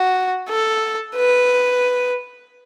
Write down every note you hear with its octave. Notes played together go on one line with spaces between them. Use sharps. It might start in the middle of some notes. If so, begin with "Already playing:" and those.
Already playing: F#4
A4
B4